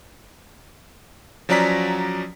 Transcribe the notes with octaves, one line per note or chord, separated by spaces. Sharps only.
F3 F#3 C#4 D5 A#5 B6